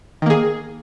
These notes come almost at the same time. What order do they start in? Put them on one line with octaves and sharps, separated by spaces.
D#3 A#3 G#4